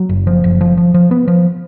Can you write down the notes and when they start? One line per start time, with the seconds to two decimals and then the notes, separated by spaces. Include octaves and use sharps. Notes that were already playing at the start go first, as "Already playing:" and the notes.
Already playing: F#3
0.09 F#1
0.27 F3
0.44 F#1
0.61 F3
0.77 F3
0.94 F3
1.11 B3
1.28 F3